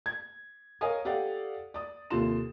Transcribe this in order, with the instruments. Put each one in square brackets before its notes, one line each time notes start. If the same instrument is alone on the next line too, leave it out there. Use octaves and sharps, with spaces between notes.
[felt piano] G#6
A#4 C#5 D#5 F5 G#5 D#6
G4 A4 D5 F5 F#5
D5 D#6
D#2 C3 F4 A4 C6 E7